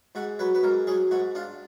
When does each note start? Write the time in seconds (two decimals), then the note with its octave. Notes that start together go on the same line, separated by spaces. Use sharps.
0.15 G#2 F#4
0.39 F#3 B4
0.55 B4
0.63 G#2 A#4
0.87 F#3 G#4
1.11 G#2 F#4
1.35 D4 F4